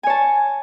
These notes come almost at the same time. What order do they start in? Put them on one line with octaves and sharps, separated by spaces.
G#5 C#5 A5